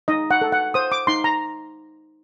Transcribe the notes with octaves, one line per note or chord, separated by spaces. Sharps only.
D#4 D#5
F#5
A4
F#5
C5 D#6
D6
D#4 C6
A#5